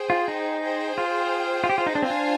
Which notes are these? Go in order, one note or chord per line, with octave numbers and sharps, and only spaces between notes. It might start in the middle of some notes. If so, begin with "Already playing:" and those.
Already playing: G#4 C5 G5
F4
D#4
G#4 C5 G5
F4
F4
G4
F4
D#4
D4
C4 F4 C5 F5 G#5
D4